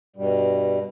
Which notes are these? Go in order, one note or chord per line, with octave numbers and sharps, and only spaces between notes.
G2 B2 G3